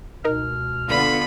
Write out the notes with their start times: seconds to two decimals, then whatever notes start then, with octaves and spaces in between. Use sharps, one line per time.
0.25 C#2 B2 D#4 A#4 F6
0.89 D3 B3 F4 B5